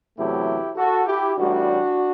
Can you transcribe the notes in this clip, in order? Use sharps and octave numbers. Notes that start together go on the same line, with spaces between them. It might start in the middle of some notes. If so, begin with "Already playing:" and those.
E2 C3 F#3 A3 E4 G4
F#4 A4
E4 G4
A1 A2 G3 D4 F#4